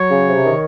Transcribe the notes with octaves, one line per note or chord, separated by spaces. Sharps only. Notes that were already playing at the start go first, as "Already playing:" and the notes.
Already playing: F#3 C#5
C#3
C3
D#3